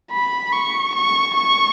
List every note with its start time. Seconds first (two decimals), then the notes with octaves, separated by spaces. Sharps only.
0.11 B5
0.53 C#6
0.95 C#6
1.36 C#6